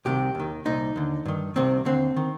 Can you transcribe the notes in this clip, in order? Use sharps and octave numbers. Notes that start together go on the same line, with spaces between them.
C2 C3 D#3 G4
D#2 D#3
C2 A#2 D#4
D#2 D3
G2 D#3
C2 C3 D#3 C4
D#2 D3 C4
D#3